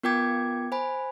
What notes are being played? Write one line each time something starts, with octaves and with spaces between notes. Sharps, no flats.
B3 F4 A#4 G5 D6 G#6
C5 G#5 B5